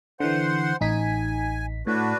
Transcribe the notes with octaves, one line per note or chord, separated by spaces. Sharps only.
D3 E3 C5 F#5 C6
A1 D#4 G#5 B6
A2 D4 F#4 B4